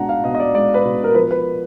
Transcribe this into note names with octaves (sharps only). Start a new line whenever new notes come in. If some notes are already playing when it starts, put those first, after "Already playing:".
Already playing: B2 G#3 D4 F#5 A#5
F5
B2 D#5
D#5
D5
G#3 D5
B4
B2
A#4
F3 B4
B4